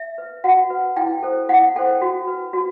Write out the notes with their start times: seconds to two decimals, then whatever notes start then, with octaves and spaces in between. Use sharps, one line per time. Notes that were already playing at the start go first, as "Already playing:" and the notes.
Already playing: E5
0.18 B4
0.44 F#4 F#5
0.70 B4
0.97 E4 G5
1.23 A4 C5
1.49 E4 F#5
1.76 A4 C5 G5
2.01 F#4
2.28 B4
2.53 F#4